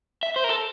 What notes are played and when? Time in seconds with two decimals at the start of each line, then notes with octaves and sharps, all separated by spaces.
0.23 E5
0.36 C5
0.44 A#4
0.49 A4